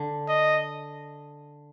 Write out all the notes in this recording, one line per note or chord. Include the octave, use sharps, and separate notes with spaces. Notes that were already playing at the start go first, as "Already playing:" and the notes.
Already playing: D3
D#5